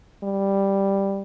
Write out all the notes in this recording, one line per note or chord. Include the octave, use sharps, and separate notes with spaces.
G3